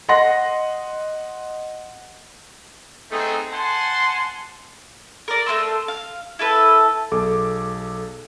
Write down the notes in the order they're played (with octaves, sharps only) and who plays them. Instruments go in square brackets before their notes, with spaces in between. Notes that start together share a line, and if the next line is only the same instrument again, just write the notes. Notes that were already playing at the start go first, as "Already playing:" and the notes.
[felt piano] D#5 F#5 C6 A#6
[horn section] A3 B3 C4 D#4 G#4
C5 F#5 G#5 A5 C6
[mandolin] A#4 D5
A3 A#3 C6 E6
F5
E4 A4 B4
[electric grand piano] B1 G#4 A4 D6